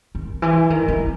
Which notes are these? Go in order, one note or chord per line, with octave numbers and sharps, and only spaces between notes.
D#3
E3
D#3
E3